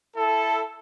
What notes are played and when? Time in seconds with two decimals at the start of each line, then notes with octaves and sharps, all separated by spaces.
0.16 E4 A4